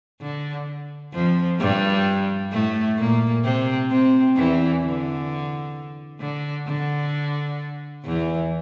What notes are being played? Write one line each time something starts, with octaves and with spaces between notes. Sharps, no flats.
D3
F2 F3
G2 G3
A2 A3
A#2 A#3
C3 C4
C3 C4
E2 E3
D3
D3
D3
E2 E3